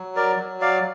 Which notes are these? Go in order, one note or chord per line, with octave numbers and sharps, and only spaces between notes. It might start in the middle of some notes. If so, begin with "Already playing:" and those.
Already playing: F#3
A#4 D5
F#3
D5 F5